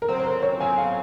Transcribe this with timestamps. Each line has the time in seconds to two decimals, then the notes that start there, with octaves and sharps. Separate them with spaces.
0.02 A#4
0.08 C#3 F#3 C4 C5
0.19 C5
0.26 A#4
0.42 C#5
0.60 C#3 F#3 C4 G#5
0.78 F5